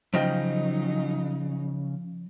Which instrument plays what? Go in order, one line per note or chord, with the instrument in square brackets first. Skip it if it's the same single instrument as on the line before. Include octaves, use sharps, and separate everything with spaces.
[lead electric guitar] C#3 [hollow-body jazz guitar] F3 D#5 G5 [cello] F#3 D#4